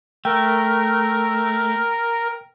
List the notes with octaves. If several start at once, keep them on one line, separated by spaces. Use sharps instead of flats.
A3 A#4 G5